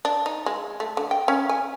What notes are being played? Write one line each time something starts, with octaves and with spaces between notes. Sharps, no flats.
D4
D#4
G#3
A3
D3
G5
C#4
G#5